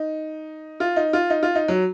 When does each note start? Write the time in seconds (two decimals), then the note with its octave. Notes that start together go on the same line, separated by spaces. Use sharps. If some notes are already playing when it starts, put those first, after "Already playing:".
Already playing: D#4
0.80 F4
0.96 D#4
1.13 F4
1.30 D#4
1.43 F4
1.55 D#4
1.68 F#3